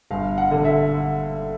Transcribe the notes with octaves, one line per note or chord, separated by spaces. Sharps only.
G1 F5
F#5
D3
E5